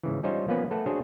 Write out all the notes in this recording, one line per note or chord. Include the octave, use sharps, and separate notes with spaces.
G#2 C#3 E3
G3 C#4 D#4 F4 C5 C#5
F3 A#3 B3 C#4 B4
A3 A4 B4 F#5
D4 F#4 G#4 C5 C#5